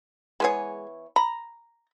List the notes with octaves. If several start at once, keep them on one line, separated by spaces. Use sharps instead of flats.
E3 G#3 B3 G#4 C#5
A#5 B5